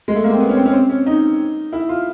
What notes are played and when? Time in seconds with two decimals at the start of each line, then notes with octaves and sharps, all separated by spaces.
0.08 G#3
0.16 A3
0.24 A#3
0.32 C4
0.40 B3
0.49 C#4
0.56 C4
0.66 C#4
0.73 C4
0.89 C#4
1.06 D#4
1.73 E4
1.89 F4